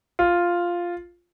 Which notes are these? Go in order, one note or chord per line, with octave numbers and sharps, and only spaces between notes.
F4